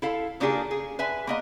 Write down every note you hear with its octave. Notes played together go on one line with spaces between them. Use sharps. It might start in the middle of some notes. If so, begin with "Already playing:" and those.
E4 A4 F5
C#3 A#3 D4 F4 G4 G#4
G#4
B4 E5 G#5
A#3 B3 D#5